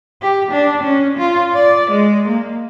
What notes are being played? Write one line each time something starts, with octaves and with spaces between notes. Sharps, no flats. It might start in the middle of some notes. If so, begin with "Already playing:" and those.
G4
D4
C#4
F4
D5
G#3
A#3